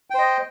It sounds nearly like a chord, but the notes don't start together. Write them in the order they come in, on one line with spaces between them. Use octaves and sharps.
G5 C5 D#5